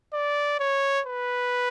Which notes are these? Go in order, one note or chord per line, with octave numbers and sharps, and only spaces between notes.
D5
C#5
B4